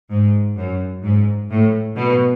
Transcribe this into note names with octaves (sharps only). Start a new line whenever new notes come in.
G#2
F#2
G#2
A2
B2